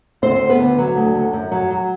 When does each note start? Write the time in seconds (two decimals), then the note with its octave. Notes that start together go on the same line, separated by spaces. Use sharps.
0.22 D2 C4 C5
0.40 D2
0.50 B3 B4
0.60 D3
0.78 F#3
0.96 D2
1.15 D2
1.33 F#2
1.52 F#3
1.70 F#3